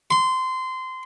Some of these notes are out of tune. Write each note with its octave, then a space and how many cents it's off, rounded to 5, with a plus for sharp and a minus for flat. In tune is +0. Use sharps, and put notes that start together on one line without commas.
C6 -20